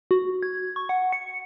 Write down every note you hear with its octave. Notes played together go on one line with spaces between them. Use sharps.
F#4
G#6
C#6
F#5
C#7